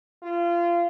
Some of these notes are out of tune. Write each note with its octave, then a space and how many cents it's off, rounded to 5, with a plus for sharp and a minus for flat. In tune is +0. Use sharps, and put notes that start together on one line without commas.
F4 -25